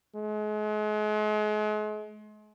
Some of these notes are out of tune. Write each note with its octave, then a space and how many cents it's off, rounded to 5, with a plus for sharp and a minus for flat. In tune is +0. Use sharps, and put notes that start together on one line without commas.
G#3 +40